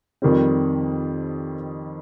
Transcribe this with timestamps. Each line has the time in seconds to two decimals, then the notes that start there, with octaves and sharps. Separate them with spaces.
0.22 F2 D#3 G3 C4